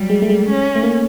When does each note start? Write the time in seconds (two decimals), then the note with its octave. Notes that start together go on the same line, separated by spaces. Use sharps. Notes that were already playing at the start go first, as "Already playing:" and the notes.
Already playing: F#3 G3
0.10 G#3
0.22 A3
0.29 G#3
0.49 C#4
0.76 A3
0.83 A#3
0.91 A3